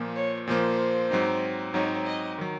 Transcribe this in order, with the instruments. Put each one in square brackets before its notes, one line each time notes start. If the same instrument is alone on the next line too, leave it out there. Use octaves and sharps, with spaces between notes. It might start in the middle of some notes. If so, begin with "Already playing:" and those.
Already playing: [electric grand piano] A#2 F3 A#3
[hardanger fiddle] C#5
[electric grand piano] A#2 F3 A#3 [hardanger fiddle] C5
[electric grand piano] G#2 F#3 C4 D#4
[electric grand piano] G#2 F#3 C4 D#4 [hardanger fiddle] C#5
[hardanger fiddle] D#5
[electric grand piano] D#3 F#3